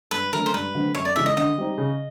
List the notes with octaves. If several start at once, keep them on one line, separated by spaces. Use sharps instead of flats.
G2 B4
D3 F#3 A3 C#4 A#4
C5
G2 B4
D3 F#3 A3 C4
F#2 C#5
D5
C#3 E3 G#3 E5
D#5
D3 D#5
G3 C4 D#4
C#3